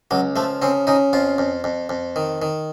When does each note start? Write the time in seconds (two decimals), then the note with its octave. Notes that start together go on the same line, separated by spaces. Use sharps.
0.11 C#2 F#3
0.36 F3 A3
0.62 C#3 C4
0.87 C#3 D#4
1.13 F2 F4
1.38 F2
1.64 F2
1.89 F2
2.16 D#3
2.42 D#3